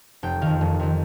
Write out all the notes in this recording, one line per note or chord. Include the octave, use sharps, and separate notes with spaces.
F1 G5
F2 D#3 F5
F1
F2 D#3